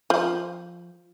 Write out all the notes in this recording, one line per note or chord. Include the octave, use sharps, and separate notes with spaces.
F3